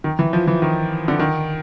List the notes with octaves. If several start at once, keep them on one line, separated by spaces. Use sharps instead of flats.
D#3
E3
F3
E3
D#3
D3
D#3